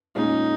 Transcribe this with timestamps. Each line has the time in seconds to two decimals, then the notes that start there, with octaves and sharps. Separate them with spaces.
0.15 A#2 G#3 C#4 D#4 F4